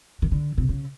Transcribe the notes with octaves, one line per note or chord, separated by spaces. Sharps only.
D#3
D3
C3
C#3